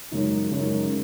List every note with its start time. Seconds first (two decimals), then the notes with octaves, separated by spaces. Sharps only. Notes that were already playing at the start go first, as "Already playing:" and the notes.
0.11 F#2 C#3 G#3 D#4
0.52 F#2 C#3 G#3 D#4